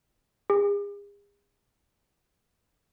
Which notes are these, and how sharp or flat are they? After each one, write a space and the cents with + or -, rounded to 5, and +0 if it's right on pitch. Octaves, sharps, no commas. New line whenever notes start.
G#4 -40